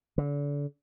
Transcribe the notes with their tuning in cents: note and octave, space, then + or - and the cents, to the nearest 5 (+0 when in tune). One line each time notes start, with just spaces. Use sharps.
D3 -35